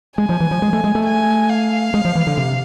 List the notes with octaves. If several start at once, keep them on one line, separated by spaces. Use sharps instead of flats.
G#3 G#5
F3
E3
F3
G#3
A3
G#3
A3
G#5
F5
G#3
F3
E3
D3
C3